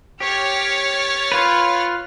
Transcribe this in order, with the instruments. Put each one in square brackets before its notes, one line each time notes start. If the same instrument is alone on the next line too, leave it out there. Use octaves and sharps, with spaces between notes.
[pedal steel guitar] G4 [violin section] C#5 F6 A6
[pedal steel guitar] F4 B4